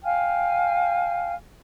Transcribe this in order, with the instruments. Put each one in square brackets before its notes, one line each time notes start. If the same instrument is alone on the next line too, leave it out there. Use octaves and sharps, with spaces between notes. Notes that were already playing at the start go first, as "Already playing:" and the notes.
[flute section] F5 G5 G#5 F6